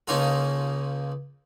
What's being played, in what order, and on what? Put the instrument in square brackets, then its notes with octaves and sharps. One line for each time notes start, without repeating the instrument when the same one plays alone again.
[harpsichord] C#2 A#3 C#4 D#4 F4 A4